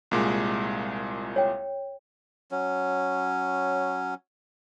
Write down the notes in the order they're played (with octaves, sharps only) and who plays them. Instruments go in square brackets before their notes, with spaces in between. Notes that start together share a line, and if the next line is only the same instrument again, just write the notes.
[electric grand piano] C2 A#2 G#3
[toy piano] C#5 G5
[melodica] F#3 C#4